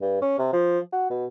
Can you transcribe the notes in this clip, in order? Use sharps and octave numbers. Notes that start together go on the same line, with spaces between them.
G2
C#4
C3
F3
F#4
B2